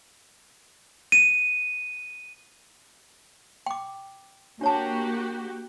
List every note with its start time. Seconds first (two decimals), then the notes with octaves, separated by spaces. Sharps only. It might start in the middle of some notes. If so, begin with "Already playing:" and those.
1.12 D#7
3.66 G5 D6
4.61 A#3 D4 F#4 G4 C#5 A5